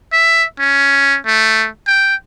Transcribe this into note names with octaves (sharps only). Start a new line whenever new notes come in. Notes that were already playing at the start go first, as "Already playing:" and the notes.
E5
C#4
A3
G5